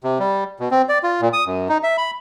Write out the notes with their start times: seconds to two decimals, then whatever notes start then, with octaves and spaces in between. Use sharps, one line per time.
0.04 C3
0.19 G3
0.60 B2
0.71 C4
0.89 D5
1.03 F4
1.21 A#2
1.33 D#6
1.47 F#2
1.69 D#4
1.83 E5
1.98 B5